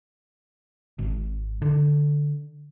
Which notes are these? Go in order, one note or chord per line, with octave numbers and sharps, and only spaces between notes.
G#1
D3